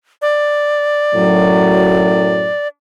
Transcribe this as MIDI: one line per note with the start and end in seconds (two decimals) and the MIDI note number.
0.22 2.68 74
1.15 2.52 42
1.15 2.52 45
1.15 2.52 54